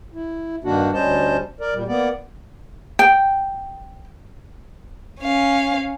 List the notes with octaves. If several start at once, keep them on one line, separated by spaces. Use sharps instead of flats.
E4
G2 D#3 A#3 D4 F#4
D2 G3 C#4 C5 D#5 A5
A#4 D5
A#2 G3
A#3 B3 D5
G5
C#4 F5